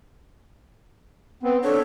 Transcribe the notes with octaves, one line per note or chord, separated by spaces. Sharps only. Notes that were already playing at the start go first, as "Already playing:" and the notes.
B3 C4
D4 A4 C#5